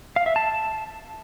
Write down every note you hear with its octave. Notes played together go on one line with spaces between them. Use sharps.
F5
E5
A5